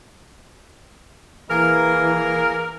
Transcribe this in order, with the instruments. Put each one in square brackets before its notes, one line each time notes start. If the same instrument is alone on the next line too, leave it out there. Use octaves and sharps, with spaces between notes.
[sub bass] E1 [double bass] E3 [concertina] A#3 G#4 [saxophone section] A#4